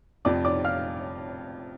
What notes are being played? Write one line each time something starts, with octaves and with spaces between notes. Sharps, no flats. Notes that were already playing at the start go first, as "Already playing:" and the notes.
F1 F2 F3 D5 D6
D5 D6
F5 F6